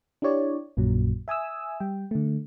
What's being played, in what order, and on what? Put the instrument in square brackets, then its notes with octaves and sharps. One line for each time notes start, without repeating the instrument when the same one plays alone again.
[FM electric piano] D4 E4 G4 C#5 D5
A#1 F#2 A#2 F#3
E5 G#5 D#6 E6
G3 G5
D3 A3